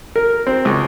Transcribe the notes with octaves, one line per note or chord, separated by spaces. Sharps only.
A#4
C4
C#2